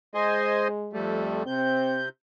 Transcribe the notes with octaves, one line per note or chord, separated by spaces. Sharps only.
G#3 C5 D#5 G#5
F2 G3 A3
C3 C4 G6